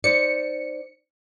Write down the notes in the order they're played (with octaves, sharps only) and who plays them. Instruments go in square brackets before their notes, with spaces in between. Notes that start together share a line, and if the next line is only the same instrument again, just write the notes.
[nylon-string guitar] D#4 C5 D5 [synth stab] C#7